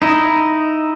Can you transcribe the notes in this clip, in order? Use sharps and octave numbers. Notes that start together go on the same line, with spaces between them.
D#4 E4 D#5